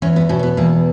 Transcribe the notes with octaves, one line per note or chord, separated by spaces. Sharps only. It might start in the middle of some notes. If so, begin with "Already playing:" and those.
E2 C#4
B3
B2 C#4
C#4
B3
E2 A#3